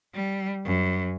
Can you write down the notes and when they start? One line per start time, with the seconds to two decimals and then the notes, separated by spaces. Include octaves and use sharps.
0.14 G3
0.65 F#2